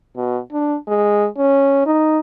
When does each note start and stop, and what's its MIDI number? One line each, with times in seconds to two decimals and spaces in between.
0.16 0.39 47
0.52 0.76 62
0.87 1.27 56
1.37 1.82 61
1.86 2.19 63